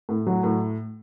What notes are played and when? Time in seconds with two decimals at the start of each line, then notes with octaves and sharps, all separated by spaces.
0.09 A2
0.27 F#3
0.43 A2